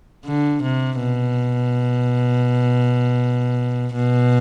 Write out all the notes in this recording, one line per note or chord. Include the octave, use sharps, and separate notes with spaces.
D3
C3
B2
B2